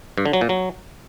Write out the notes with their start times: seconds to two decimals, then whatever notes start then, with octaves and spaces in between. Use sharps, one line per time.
0.18 G2
0.25 D3
0.33 F#3
0.41 A#2
0.49 F#3